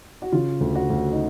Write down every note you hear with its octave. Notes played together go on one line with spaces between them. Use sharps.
F#4
C#3 F4
D2
F#4
D2
D#4